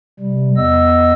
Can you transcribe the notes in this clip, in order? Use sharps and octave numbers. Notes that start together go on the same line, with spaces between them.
C3 G3
E2 B3 D#5 E6